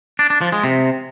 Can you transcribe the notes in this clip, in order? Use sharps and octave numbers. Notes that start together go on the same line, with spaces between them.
D4
D4
F3
G#3
C3